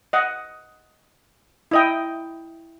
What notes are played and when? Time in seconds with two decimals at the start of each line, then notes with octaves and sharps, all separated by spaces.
0.13 D#5 F#5
1.71 E4 D#5 G5